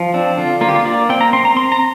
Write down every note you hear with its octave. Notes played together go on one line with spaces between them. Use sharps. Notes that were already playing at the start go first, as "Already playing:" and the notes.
Already playing: F3
C4 D4
D3 F4
A#3 F4
G4
F4
A#3 D5
C4 G5
A#5
C4 C6
A#5
C4 C6
A#5